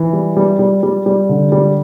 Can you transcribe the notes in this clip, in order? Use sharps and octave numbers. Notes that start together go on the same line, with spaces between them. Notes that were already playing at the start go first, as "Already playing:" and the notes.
Already playing: E3
G3
G3
G3
G3
G3
D3
G3